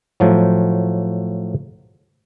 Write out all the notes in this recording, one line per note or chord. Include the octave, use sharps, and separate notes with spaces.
A2 F3 F#3